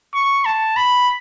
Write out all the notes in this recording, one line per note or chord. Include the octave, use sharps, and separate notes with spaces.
C#6
A5
B5